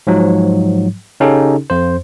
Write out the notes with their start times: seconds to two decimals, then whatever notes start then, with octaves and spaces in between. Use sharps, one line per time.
0.07 G#2 F3 F#3
1.20 C#3 C#4 D#4 G4 A4
1.70 F2 C5